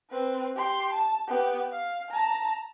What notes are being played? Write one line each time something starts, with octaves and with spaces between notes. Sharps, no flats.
C4 B4
G4 C6
A5
B3 G4
F5
A5 A#5